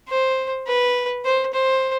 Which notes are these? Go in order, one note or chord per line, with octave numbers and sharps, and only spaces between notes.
C5
B4
C5
C5